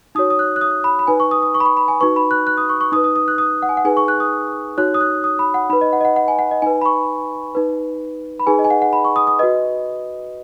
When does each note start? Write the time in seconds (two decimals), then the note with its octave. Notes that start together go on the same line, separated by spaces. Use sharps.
0.15 D#4 F#4 C#5 D#6
0.30 D#6
0.39 F#6
0.56 F#6
0.61 D#6
0.84 B5
0.99 B5
1.07 D#4 B4 G#5
1.20 C#6
1.31 D#6
1.42 D#6
1.55 C#6
1.60 B5
1.66 C#6
1.77 B5
1.88 G#5
2.01 D#4 F#4 B4 C#6
2.16 B5
2.31 F#6
2.47 F#6
2.57 D#6
2.69 C#6
2.81 C#6
2.92 D#4 D#6
2.96 B4
3.04 D#6
3.16 D#6
3.28 F#6
3.38 D#6
3.62 F#5
3.69 G#5
3.77 F#5
3.85 D#4 G#4 B4 G#5
3.97 C#6
4.08 F#6
4.20 D#6
4.77 D#4 F#4 C#5 F#6
4.94 D#6
5.01 F#6
5.24 D#6
5.39 B5
5.54 F#5
5.69 D#4 B5
5.73 B4
5.81 D#5
5.93 F#5
6.01 D#5
6.05 F#5
6.16 F#5
6.28 G#5
6.39 F#5
6.51 D#5
6.62 D#4 B4 G#5
6.81 B5
6.86 C#6
7.55 D#4 B4
8.40 B5
8.46 D#4 G#4 B4 G#5
8.59 D#5
8.65 G#5
8.70 F#5
8.82 F#5
8.93 B5
9.05 C#6
9.16 D#6
9.27 D#6
9.39 F#4 B4 D#5